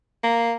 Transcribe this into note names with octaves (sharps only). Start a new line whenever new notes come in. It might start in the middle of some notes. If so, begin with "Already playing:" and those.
A#3